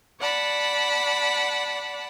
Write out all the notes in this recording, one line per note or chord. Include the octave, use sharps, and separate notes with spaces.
D5 F#5 A5 B5